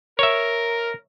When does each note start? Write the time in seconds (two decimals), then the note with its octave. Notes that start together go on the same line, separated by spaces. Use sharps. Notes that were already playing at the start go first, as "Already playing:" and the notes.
0.19 A#4 C#5 E5